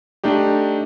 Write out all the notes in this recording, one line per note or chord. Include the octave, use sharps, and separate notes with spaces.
A3 D4 D#4 G4